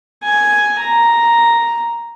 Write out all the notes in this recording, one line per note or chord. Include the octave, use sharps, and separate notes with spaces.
G#5
A#5